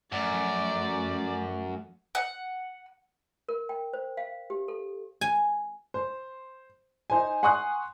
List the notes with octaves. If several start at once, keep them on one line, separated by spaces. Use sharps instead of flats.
F#2 F3 A3 D5
F#5
A#4
G5
C5
F5
G4
A4
G#5
C5
D#4 C5 G#5
F#5 G#5 C6 C#6 D#6 F#6